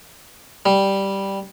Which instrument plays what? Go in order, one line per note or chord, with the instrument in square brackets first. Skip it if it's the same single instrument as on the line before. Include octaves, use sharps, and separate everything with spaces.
[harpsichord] G3